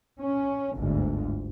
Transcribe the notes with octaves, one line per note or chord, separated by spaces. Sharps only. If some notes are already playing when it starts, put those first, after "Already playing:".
C#4
G1 D2 G#2